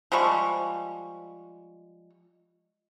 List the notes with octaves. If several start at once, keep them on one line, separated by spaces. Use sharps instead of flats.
F3 G3 G#3 C#6